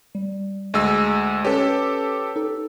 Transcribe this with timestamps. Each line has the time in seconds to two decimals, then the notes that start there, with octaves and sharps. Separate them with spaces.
0.15 G3
0.74 D2 G#3 D#5 E6
1.45 C#4 G4 A4 B4 C#5
2.36 D#4 A4